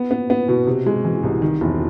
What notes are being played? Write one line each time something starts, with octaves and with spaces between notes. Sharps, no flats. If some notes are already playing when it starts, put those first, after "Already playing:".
Already playing: B3
B3
B3
B2
C3
G#3
E3
C2
D#3
E1